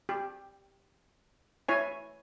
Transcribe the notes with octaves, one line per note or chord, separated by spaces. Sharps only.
G4
E4 C#5 G#5